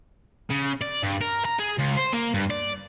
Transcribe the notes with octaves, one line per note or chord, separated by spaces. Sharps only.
C#3
D5
G2
A#4
A#5
G#4
C#2
C5
A#3
G2
D5